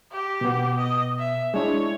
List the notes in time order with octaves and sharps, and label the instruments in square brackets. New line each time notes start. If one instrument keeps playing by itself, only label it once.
[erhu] G4
[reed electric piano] B2 B3
[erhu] D#5
E5
[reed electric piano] G#3 D4 E4 [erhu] C#5